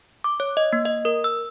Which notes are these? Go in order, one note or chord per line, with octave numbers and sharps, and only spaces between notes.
D6
C#5
D#5
A#3
D#5
A#4
E6